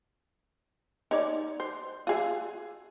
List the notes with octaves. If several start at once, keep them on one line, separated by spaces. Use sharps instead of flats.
D#4 C#5 D5
C5
F4 G#4 E5